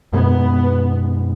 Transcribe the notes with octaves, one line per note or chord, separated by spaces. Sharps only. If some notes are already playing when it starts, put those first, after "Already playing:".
F#2 B2 G#3 B3